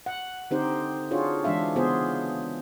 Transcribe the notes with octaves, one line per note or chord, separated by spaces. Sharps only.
F#5
D3 C4 D#4 G4 C5
D4 F4 F#4 G#4 C#5
E3 G#3 D4 E5 F5
C#3 B3 F4 G#4 C5